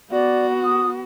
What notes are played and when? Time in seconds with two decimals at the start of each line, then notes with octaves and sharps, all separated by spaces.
0.11 B3 F#4 D5
0.63 D#6